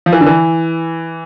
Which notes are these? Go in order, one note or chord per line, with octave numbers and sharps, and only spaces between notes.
F3
E3
D3
E3